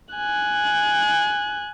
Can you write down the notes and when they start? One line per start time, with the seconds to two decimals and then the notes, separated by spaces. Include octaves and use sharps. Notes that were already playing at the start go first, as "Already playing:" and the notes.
0.15 G#5 F#6